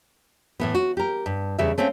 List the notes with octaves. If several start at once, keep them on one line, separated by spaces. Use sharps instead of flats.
A2 E3 B3
F#4
G4 A#4
G2
E2 C#3 G3 E5
A3 C4 C#4 F5